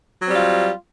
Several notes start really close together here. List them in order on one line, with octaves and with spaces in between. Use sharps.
F#3 C4 G3 F4